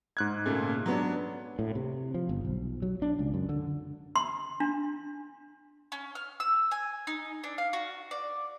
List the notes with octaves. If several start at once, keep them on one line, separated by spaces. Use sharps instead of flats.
G#2 F#6 G#6
A#2 C#3 A3
F#3 B3 D4
A2
C3
F3
G1
B1
F#3
D4
C#2
F#2
D3
C6
D4
C#4
F6
E6
G#5
D#4
D4
F5
F#4
D5